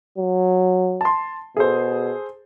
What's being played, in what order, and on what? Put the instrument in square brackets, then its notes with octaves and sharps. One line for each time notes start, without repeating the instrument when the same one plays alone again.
[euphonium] F#3
[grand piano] A5 C6
[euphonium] B2 [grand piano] G#4 A4 C5